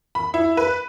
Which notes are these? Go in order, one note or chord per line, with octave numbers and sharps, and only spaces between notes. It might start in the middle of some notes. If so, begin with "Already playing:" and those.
B5
E4
B4